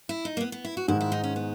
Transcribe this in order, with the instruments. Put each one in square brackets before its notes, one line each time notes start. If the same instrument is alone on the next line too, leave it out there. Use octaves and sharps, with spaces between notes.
[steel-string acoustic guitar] E4
D#4
A#3
B3
B3
E4
F#4
[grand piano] G#2 D#3 G#3 [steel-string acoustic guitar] E4
[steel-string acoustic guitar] E4
D#4
C#4
B3